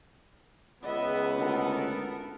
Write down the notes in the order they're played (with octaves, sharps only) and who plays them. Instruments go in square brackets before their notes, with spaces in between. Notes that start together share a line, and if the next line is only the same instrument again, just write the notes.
[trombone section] C#2 [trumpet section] B3 [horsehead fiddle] D#5 E5
[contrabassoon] D2 [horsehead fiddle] A4 A#4